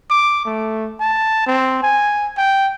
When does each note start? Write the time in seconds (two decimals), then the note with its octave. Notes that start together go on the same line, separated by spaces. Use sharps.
0.10 D6
0.45 A3
1.00 A5
1.47 C4
1.83 G#5
2.38 G5